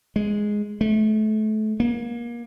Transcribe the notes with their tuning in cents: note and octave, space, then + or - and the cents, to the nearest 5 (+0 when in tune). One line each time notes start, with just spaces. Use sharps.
G#3 +0
A3 -30
A#3 +30